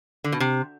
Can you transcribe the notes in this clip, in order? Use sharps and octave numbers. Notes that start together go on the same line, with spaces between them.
D3
B2
C3